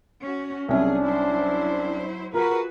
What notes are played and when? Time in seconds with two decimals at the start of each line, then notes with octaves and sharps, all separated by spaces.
0.21 C#4 F#4
0.68 C2 F#3 C#4 D4 G#4 E5
1.04 F#3 E4 C5
2.34 F4 F#4 G#4 A#4 B4